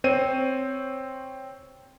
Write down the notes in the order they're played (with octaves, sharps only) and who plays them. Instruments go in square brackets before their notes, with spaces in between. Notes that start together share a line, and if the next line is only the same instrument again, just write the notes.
[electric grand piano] C4 C5 C#5 D#7